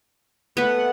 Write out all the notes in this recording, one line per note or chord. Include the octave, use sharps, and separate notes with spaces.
A3 B3 B4 F#5